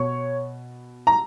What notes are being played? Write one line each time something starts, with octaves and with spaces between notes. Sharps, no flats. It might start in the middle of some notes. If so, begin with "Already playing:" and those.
Already playing: B2 C#5 C#6
A#5